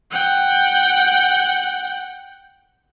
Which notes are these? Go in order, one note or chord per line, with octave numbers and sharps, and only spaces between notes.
F#5 G5